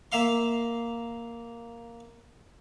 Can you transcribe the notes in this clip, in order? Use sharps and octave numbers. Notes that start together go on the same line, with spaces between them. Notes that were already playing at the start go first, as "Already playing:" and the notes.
A#3 E5 F5 C6